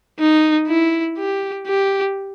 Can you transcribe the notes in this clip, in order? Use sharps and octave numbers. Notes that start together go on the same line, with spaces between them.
D#4
E4
G4
G4